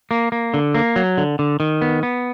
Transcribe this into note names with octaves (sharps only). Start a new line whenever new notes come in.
A#3
A#3
D3
A#3
F#3
D3
D3
D#3
B3
B3